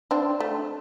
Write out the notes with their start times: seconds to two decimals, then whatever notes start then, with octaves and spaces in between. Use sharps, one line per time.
0.11 C4 D4
0.40 A3